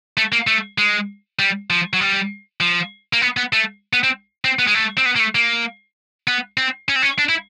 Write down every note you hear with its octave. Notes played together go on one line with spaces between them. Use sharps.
A3
A#3
A3
G#3
G3
F3
F#3
G3
F3
A#3
B3
B3
A3
B3
C4
C4
B3
G#3
A3
C4
B3
A#3
A3
A#3
B3
C4
C#4
C4
C#4
D4
E4